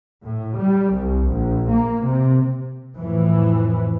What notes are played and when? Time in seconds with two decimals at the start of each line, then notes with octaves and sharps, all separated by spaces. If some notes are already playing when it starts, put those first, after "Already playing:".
0.24 A2
0.58 G3
0.94 C2
1.28 A#1
1.70 A#3
2.06 C3
2.96 F2 A2 E3